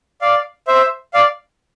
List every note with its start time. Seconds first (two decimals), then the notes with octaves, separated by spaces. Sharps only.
0.21 D5 F5
0.67 C5 E5
1.14 D5 F5